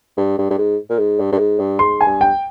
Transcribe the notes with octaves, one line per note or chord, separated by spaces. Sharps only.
G2
G2
G2
G#2
A#2
G#2
G2
G2
G#2
G2
G#2 C6
G#5
G2
G5